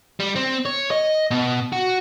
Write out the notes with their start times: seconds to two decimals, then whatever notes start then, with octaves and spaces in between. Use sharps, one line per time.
0.20 G3
0.36 C4
0.66 C#5
0.91 D#5
1.31 B2
1.72 F#4